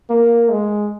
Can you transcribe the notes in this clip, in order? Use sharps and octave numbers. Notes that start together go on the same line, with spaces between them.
A#3
G#3